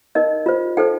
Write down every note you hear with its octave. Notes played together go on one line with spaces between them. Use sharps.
D#4 A#4 D#5
F4 C5
D#4 A4 C5 G5